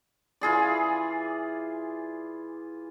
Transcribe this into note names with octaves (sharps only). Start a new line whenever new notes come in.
E3 F4 G#4 D5